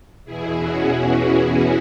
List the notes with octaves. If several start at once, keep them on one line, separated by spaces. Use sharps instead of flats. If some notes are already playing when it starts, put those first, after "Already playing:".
E2 B2 E4 G#4
C#4 F#4
E3